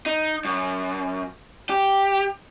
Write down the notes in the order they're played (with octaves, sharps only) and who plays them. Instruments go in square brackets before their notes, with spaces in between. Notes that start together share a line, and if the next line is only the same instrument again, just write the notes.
[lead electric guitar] D#4
F#2
G4